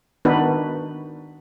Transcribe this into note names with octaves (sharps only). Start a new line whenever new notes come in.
D#3 B3 D4 D#4 F#4 B4